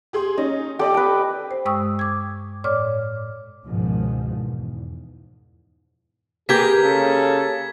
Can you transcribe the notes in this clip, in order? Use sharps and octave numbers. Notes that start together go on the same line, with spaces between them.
G4 G#4 C6
C#4 D#4 D#5
G4 A4 D5 D#5
B4 G5
C5
G2 G#3 G5 C#6 D#6 E6
D6 G#6
A2 C#5 D5 D6 F6
C#2 G#2 B2 D#3 F3
E2
A#3 G4 G#4 A#4 B4 G#6 B6
C#3 A4